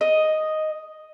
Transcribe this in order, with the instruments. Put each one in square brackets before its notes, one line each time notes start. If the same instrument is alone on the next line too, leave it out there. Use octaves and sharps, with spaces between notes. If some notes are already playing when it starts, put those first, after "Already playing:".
[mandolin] D#5